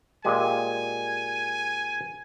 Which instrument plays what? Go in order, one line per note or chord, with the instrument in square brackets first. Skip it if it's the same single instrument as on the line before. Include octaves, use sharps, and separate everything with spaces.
[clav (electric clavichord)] A#2 G#3 G4 [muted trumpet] G#5